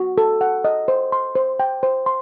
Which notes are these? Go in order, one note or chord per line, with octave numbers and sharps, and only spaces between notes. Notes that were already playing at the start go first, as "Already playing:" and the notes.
Already playing: F#4
A4
F#5
D#5
C5
C6
C5
G5
C5
C6